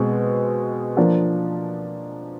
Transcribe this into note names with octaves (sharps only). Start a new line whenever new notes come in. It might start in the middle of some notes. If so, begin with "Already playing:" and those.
Already playing: B2 G#3 C4
F3 A#3 D4